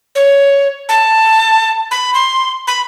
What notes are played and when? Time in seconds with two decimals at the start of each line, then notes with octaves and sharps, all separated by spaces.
0.15 C#5
0.89 A5
1.91 B5
2.14 C6
2.67 B5